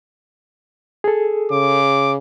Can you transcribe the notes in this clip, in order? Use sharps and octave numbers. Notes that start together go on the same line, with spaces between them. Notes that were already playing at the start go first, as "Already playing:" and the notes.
G#4 A4
C#3 D6